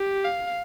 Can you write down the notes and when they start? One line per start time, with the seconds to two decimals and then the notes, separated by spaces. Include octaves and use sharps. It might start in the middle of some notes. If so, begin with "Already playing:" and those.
Already playing: G4
0.25 F5